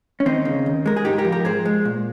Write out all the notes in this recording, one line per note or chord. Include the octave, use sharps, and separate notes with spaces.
C#4
D#2 C4 D#4
C#3
D#2
G#3 A#4
G#4
G#2 D#4 G4
G4 A#4
F3
G4 A#4
G#2 G#4 C5
G#3
A#2